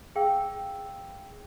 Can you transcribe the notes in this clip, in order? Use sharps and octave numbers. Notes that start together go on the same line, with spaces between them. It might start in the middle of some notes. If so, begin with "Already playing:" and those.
G#4 F5 G5 E6